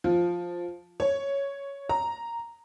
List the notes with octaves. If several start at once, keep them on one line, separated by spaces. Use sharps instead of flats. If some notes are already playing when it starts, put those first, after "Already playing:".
F3
C#5
A#5